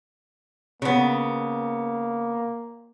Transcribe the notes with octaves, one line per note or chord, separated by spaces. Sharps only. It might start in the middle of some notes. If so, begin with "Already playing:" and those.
C#3 A#3 B3